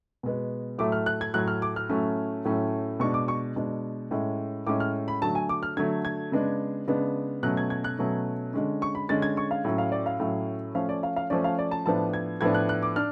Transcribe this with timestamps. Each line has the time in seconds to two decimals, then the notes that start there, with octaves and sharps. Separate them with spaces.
0.23 B2 G#3 B3
0.78 A2 F#3 A3 D6
0.92 F6
1.06 F#6
1.21 G#6
1.34 A2 F#3 A3 F#6
1.48 F6
1.62 D6
1.76 F6
1.89 A2 F#3 A3 C#4
2.45 A2 F#3 A3 C#4
3.00 B2 G#3 D4 C#6
3.14 D6
3.28 C#6
3.56 B2 G#3 D4
4.11 A2 G#3 C#4
4.67 A2 G#3 C#4 D6
4.80 F6
5.08 B5
5.22 D3 F#3 A3 A5
5.35 G#5
5.49 D6
5.63 F6
5.77 D3 F#3 A3 G#6
6.05 G#6
6.32 C#3 G#3 B3 D4
6.88 C#3 G#3 B3 D4
7.43 B2 F#3 A3 C#4 F#6
7.57 G#6
7.70 G#6
7.84 F#6
7.99 B2 F#3 A3 C#4
8.54 D3 G#3 C#4
8.82 C#6
8.95 B5
9.09 D3 G#3 C#4 A6
9.22 G#6
9.37 C#6
9.51 F5
9.65 A2 F#3 C#4
9.78 F5
9.92 D5
10.06 F5
10.20 A2 F#3 C#4
10.75 F3 A3 C#4 F5
10.89 D5
11.03 F5
11.16 F5
11.30 F3 A3 C#4 D5
11.44 F5
11.59 D5
11.71 A5
11.86 A2 F3 B3 D4 A5
12.13 G#6
12.41 A2 F3 B3 D4 G#6
12.54 F#6
12.69 F#6
12.83 D6
12.96 D4 F6